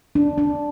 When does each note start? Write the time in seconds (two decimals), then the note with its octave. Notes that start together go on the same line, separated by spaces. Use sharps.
0.15 D4
0.38 D4